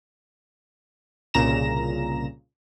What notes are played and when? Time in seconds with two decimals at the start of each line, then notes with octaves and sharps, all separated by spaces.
1.34 C2 A#2 C#3 A#5 A#6 E7